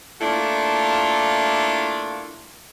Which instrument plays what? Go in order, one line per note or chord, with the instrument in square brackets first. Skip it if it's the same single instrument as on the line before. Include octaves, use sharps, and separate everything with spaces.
[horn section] A3 A#3 D4 E4 F4